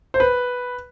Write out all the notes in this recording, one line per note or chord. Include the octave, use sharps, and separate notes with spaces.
C5
B4